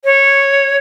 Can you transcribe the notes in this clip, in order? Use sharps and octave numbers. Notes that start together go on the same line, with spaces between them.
C#5